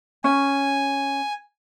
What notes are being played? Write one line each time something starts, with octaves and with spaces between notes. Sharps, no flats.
C#4 G#5